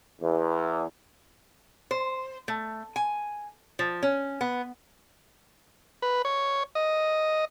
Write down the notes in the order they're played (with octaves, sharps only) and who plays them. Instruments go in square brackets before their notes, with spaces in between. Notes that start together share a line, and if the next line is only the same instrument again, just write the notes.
[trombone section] E2
[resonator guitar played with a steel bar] C5
A3
G#5
F3
C#4
B3
[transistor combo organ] B4
C#5
D#5